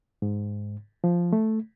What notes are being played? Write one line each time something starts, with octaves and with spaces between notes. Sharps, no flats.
G#2
F3
A3